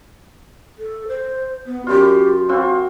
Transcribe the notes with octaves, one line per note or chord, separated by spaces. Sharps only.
A4
C5
B3
F#2 F4 G4
C4 F4 F#4 F5